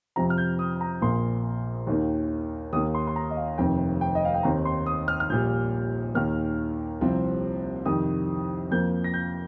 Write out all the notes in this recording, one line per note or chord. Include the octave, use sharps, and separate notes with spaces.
F2 C3 F3 A#5
F6
G6
D#6
A#5
A#1 A#2 A#3 C6
D#2 D#3 A#3
D#2 D#3 A#3 D#6
C6
C6
A#5
D#5
F5
F1 F2 C3 D#3 G5
G5
D#5
F5
G5
D#2 D#3 C4 A#5
C6
D#6
F6
F6
A#1 A#2 G3 G6
D#2 D#3 A#3 F6
C2 C3 F3 C4
F2 C3 D#3 G3 D#6
F2 F3 A#3 G6
A#6
G6